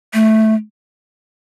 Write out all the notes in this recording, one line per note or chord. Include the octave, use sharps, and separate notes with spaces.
A3